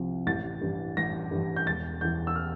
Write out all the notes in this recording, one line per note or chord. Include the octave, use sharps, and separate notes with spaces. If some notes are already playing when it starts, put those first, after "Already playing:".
Already playing: C2 C3 F3
A1 A6
G2 E3
A1 A#6
G2 E3
G6
E1 A6
E2 E3 G6
E6
F6